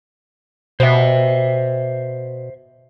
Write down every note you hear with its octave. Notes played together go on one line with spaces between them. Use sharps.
B2 C5 E5